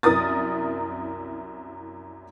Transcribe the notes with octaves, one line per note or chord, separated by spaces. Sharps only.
C2 F#2 E4 A#4 D#6 A6